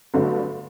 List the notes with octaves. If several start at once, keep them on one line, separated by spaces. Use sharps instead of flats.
G1 G2 D3 F#3 A3